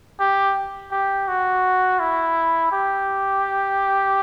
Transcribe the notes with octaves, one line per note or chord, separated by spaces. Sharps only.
G4
G4
F#4
E4
G4